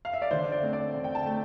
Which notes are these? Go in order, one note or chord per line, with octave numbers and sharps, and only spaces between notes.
F5
E5
D5
D3 C5
D5
A3 C4
D5
D3
G5
A5
A3